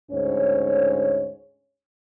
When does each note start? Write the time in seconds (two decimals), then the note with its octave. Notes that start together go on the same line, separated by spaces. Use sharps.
0.12 D2 G#2 C#4 C5 C#5